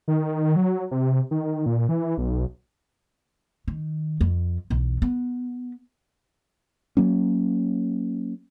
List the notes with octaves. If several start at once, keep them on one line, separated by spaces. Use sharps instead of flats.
D#3
F#3
C3
D#3
A#2
E3
B1
D#3
F2
B1 E2
B3
F#3 A#3 C#4